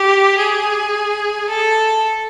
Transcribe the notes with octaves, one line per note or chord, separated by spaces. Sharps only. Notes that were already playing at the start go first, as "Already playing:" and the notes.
Already playing: G4
G#4
A4